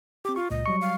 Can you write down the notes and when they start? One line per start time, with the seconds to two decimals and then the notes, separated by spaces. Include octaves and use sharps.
0.25 C4 G4 D6
0.36 F4 C#6
0.51 C#2 A#2 D#5
0.66 F#3 G3 C#6 C#7
0.81 F5